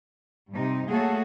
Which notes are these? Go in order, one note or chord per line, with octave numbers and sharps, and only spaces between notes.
G2 C3 D#4
A3 A#3 F#4 G#4 A4 C#5